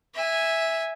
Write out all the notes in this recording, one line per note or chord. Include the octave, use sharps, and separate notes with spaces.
E5 G#5